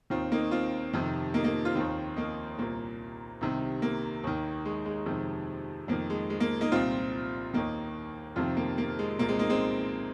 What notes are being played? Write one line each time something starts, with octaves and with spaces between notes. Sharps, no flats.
D#2 D#3 C4 F4
A#3 D#4
C4 F4
F2 C3 D#3
A#3 D#4
A#3
C4 F4
D#2 D#3 C4 F4
A#3 D#4
C2 A#2 A#3
C2 C3 D#3
A#3
D#2 D#3
G#3
G#3
F2 C3 D#3
F2 D#3 A#3
G#3
G#3
A#3
A#3 D#4
C2 A#2 C4 F4
D#2 D#3 A#3 D#4
F2 C3 D#3 C4 F4
A#3
A#3
G#3
C2 A#2 A#3
G#3 C4
A#3 D#4
G#3 C4